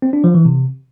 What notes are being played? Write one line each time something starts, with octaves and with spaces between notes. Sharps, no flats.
C4
D4
F3
E3
C3